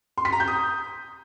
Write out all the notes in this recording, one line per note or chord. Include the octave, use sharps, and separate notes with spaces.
C6
B6
A#5
G6
D#6